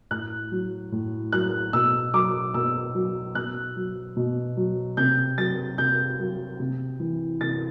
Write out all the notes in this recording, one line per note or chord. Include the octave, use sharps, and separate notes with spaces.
A2 F#6
F#3
A2
F#3 F#6
B2 E6
F#3 D6
B2 E6
F#3
B2 F#6
F#3
B2
F#3
C3 G6
F#3 A6
C3 G6
F#3
C3
E3
C3 A6